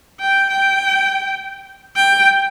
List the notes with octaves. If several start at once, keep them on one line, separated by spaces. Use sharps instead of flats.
G5
G5
G5